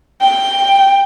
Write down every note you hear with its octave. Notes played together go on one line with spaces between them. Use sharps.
G5